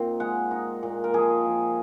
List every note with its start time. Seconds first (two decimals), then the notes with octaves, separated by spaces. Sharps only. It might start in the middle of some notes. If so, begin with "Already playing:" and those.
Already playing: A#2 C4 D#4
0.20 G#3 F#5
0.51 D#4
0.83 A#2
1.04 A#4
1.14 F3 G#4
1.45 F3